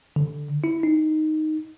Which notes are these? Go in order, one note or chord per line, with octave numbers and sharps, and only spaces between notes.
D3
E4
D#4